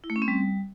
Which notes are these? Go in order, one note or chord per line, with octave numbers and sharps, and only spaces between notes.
E4
A3
C#4
C4
G3